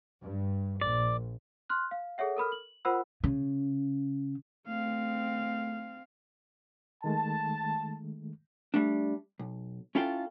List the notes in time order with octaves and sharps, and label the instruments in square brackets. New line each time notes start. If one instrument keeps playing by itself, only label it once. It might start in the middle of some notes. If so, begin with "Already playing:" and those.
[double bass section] G2
[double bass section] A#1 [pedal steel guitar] D5
[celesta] C6 F6 F#6
F5
G#4 A4 C#5 E5 F#5
A4 A#4 B5 F6
F#7
F4 A#4 C5 F#5 B5 E6
[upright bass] C#3
[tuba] A3 [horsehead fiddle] C4 F5
[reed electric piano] D#3 G#3 A3 [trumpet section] A5
[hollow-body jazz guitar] G3 A3 D4
B1
C#4 E4 F4 A4 F5 G5